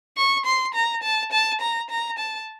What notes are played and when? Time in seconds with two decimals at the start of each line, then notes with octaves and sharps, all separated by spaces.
0.17 C#6
0.46 C6
0.75 A#5
1.03 A5
1.32 A5
1.61 A#5
1.90 A#5
2.19 A5